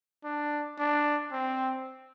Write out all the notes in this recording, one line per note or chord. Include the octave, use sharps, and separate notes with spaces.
D4
D4
C4